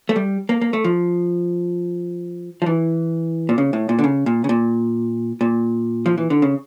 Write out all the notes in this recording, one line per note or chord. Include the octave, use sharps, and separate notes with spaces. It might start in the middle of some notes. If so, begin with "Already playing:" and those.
A3
G3
A#3
A#3
A3
F3
F3
E3
A#2
C#3
A2
A#2
D3
C#3
A#2
C#3
A#2
A#2
F3
E3
D3
C#3